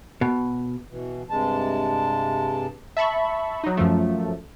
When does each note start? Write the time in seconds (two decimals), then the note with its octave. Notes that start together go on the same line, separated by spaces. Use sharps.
0.21 B2
0.91 B2 E3
1.30 G2 C3 G#3 A5
2.97 E5 A5 B5 C#6
3.64 F#3 D#4
3.77 F#2 F3 A3